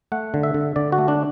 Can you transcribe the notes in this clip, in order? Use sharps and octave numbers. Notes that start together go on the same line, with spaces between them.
A3 F#5
D3
E5
D3
D3 D5
F#4
A3
D4